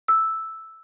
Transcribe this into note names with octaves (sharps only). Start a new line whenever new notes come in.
E6